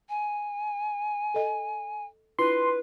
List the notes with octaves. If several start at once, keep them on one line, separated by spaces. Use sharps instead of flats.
G#5
A4 D#5
D4 E4 F4 B4 C6